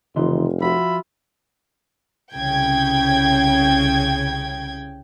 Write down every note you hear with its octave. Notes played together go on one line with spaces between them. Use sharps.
F1 C#3 E3 D#4 F4 C6
F3 F4 F#4 E5 B5
C2 C#3 G5 G#6